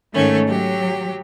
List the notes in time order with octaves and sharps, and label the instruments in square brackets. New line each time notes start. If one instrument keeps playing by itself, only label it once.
[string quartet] G#2 C#4 [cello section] D#3 A3
[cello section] F#3 [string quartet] G4